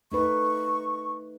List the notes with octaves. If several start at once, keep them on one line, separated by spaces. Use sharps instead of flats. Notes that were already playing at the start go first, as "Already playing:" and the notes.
A3 D#4 B4 C#6